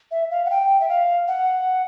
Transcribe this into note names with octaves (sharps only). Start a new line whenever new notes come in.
E5
F5
F#5
G5
E5
F5
F#5